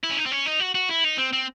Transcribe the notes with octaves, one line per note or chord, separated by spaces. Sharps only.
E4
C#4
D#4
C4
C#4
D#4
F#4
F#4
E4
D#4
C4
C4